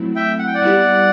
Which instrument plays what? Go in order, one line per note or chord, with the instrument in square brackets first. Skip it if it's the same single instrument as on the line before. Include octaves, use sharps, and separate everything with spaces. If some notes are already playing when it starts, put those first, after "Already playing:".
Already playing: [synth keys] F#3 A3 C4 E4
[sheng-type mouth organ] E5 G5
F#5
G5
D5 F#5
[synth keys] G3 B3 E4 G4